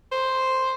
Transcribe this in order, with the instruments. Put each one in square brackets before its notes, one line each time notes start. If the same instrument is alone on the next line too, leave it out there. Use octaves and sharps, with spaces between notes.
[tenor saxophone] C5